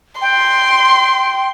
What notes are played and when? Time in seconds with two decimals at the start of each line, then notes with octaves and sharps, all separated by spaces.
0.21 G5 C6